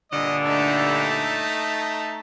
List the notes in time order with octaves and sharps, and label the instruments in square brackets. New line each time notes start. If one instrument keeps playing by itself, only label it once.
[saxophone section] G2 A#2 D3 [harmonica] D#5
[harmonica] A3 D#4 A5